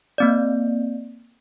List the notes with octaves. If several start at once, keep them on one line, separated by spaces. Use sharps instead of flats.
A#3 C4 D5